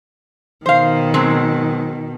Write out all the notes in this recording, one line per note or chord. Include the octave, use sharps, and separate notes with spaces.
B2 D#3 C5 F5
F#3 G#3 C4